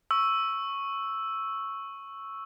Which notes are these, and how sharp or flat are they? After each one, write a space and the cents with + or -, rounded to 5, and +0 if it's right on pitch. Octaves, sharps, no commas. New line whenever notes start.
C#6 -5 E6 +0